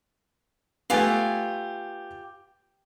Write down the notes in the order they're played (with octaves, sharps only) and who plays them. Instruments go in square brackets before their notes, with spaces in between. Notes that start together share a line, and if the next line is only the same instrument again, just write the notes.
[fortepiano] A3 B3 [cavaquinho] F4 G4 G#5